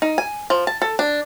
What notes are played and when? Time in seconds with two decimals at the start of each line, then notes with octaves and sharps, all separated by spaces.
0.02 D#4
0.18 G#5
0.50 F3
0.67 A5
0.82 A4
0.99 D4